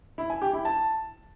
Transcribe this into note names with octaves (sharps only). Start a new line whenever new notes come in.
E4
G#5
G4
E4
A5